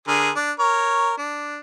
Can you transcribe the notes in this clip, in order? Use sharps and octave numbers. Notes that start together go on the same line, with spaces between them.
D3 G#4 A#4
D4
A#4 C#5
D4